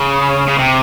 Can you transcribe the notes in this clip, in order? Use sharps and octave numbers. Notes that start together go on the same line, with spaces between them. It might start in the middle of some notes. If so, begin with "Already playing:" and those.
Already playing: C#3
C#3
C3